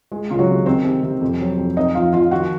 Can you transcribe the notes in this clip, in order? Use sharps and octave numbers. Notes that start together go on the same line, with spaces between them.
G#3
C#2 F4
F#3 F#4
C3
D#3 C4 C5
C3
C3
F2
F#3
F2
C4 D#4 D#5
F3 F4 F5
F3 F4 F5
D#3 F#4 F#5